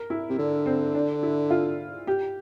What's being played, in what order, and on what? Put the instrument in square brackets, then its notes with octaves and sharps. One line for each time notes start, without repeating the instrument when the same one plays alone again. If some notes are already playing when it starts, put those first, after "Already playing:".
Already playing: [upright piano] A#4
E4
[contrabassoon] C3
[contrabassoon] D3 [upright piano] D4
[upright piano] C4
D4
E4
F4
G4